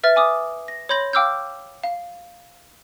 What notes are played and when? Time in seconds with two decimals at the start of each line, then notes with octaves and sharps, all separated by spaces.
0.03 B4 E5 F6 A6
0.16 G#5 D6 D#6
0.68 A#6
0.89 C#5 B5 C6 G6 A#6 F#7
1.13 F5 G5 D6 E6 F6 G6
1.84 F5